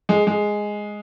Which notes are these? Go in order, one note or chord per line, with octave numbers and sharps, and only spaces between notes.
G#3
G#3